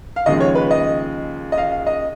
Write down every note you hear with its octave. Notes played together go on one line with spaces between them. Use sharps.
F5
D#2 C#3 F3 G#3 D#5
C#5
B4
D#5
D#5
F5
F5
D#5